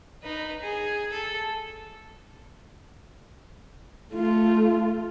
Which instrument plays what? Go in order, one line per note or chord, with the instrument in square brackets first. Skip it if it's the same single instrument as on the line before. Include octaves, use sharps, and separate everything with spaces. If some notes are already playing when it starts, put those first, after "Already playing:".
[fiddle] D#4 B4
G#4
A4
[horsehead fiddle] A3 F4